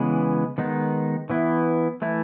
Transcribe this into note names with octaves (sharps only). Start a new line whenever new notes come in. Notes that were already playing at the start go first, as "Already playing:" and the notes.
Already playing: C#3 E3 G#3 B3
D#3 G#3 B3 D#4
E3 B3 E4
E3 A3 E4